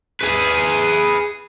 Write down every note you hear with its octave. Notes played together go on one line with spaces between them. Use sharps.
G#4 B4